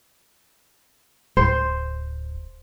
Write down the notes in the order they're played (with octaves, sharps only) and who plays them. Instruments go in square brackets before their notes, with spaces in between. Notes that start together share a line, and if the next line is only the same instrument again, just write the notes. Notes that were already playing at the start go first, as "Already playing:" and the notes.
[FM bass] D1 [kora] C5